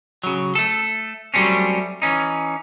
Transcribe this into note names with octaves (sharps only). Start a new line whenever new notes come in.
C#3 F#3
A3 A4
F#3 G3 A3 C4 C#4
E3 C#4 D#4